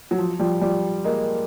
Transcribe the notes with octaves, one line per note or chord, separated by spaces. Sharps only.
F#3
F3
F3 G3
F3 G3
G#3 A#3